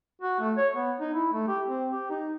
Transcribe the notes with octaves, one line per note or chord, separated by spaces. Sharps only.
F#4
A3
C#5
B3
D#4
E4
A3
G4
C4
G4
D#4